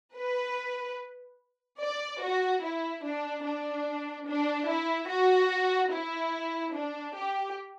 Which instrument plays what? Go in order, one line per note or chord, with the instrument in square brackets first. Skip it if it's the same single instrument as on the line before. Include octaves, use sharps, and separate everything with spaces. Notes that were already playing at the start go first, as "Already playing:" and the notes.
[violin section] B4
D5
F#4
E4
D4
D4
D4
E4
F#4
E4
D4
G4